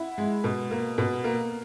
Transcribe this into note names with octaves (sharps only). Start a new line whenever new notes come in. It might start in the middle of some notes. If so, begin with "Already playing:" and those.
Already playing: E4 F#5
G#3
B2
A#3
B2
A#3